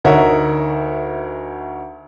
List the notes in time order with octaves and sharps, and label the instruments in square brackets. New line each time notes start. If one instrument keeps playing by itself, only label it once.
[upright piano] D2 D#4 A#4 C#5 E5 F#5